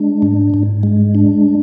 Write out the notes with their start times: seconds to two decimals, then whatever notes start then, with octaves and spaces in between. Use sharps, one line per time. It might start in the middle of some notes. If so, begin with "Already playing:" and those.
Already playing: G#3 D4
0.22 G#2
0.54 G#2
0.83 G#3
1.15 D4